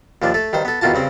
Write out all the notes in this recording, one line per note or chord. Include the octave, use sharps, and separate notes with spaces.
D#2 F3 D4
A3 A4
G2 D#3 C5
B3 A4
E2 B2 D#3 F4 F#4 A5
G2 C#3 C4